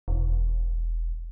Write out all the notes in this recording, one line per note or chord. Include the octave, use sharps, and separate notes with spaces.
E1